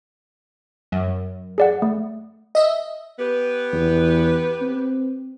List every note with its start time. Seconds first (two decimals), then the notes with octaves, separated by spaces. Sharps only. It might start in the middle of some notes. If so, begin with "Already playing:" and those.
0.92 F#2
1.58 G#4 D5 F#5
1.82 A3
2.55 D#5 E5
3.19 B3 G4 B4
3.73 E2
4.61 C4